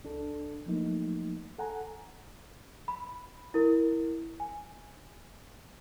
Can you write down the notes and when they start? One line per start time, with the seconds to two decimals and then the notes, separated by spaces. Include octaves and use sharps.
0.04 C#2 D4 A4
0.66 F3 F#3 A3 A#3 D#4
1.58 A4 F#5 G#5 A#5
2.88 B5
3.54 E4 A#4
4.40 G#5